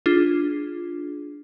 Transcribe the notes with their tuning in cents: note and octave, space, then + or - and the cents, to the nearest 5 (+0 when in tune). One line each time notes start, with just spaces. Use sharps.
D4 +0 F4 +0 G#4 +0